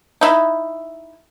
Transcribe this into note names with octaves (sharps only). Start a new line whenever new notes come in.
D#4 E4